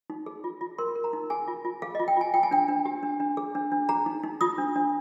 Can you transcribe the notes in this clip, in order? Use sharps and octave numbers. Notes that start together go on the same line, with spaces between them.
D#4
G#4
F4
F4
A#4 C6
A#4
A#5
D#4
G#4 G#5
F4
F4
G#4 F5
F4 D#5
G5
F4 G#5
F4 G5
G#5
D4 G5
D4
G4
D4
D4
G#4
D4
D4
G#4 A#5
D#4
D#4
F4 D#6
D4
D4